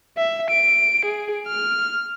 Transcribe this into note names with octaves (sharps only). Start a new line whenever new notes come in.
E5
D7
G#4
F6